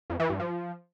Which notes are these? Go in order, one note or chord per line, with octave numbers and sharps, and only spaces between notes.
F2
E3
G2
F3